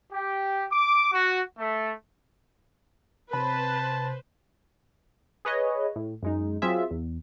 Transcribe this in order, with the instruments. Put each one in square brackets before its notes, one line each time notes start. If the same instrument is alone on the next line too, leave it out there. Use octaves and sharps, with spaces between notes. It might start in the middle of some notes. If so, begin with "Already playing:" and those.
[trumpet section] G4
D6
F#4
A3
[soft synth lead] C3 [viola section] B4 C5 [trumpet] A5 [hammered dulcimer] B5
[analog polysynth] G#4 B4 C#5 D#5
A2
F#2 G#3 D#4
F#3 C4 F4 G#4 E5
E2